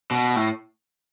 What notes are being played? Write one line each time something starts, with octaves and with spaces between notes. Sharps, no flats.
B2
A2